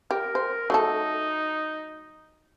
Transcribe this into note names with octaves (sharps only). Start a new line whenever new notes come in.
G4 A#4
C5
F#3 A3 D#4 A4